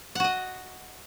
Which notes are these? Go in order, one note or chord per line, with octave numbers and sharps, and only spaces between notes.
F#4 D#5 F#5